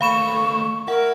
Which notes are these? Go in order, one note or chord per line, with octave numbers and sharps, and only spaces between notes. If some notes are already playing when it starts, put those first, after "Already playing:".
D#2 A3 F5 B5 C#6 E7
E4 A#4 F#5